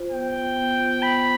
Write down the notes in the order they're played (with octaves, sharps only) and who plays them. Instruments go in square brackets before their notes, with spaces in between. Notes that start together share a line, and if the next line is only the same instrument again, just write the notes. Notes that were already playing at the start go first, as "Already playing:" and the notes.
Already playing: [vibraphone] F4 C5
[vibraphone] B3 [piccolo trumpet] G5
[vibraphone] F4 C5
B3
F4 C5
[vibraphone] B3 [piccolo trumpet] B5